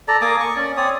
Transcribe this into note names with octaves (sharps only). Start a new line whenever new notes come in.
A4 D5 A#5
A#3 G#5 D6 D#6
C#6
C#4 D5
C4 C#5 D5 D#6